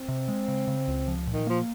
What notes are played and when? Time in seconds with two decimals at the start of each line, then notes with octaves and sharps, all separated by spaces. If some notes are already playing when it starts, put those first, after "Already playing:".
Already playing: C4
0.08 C3
0.28 G#3
0.48 C#3
0.68 C#3
0.88 C#2
1.08 F3
1.27 A#2
1.33 D#3
1.47 F3 A#3